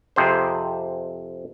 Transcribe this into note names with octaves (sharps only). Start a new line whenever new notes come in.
F2 C3 G#4 C5